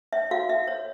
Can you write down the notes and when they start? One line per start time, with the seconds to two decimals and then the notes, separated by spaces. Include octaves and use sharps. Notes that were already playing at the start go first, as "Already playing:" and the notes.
0.13 C#5 E5
0.31 F#4 F5
0.49 F#4 E5
0.67 C#5